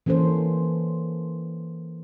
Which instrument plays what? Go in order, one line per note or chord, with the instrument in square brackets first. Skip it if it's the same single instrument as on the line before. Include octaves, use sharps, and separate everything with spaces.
[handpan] E3 A#3 C#4 A4 C5